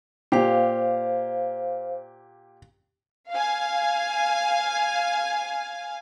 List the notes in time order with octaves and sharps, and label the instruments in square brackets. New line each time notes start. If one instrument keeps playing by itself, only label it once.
[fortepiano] A#2 G4 [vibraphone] C5 F5
[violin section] F5 G#5